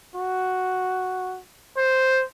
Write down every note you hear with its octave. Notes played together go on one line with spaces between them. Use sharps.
F#4
C5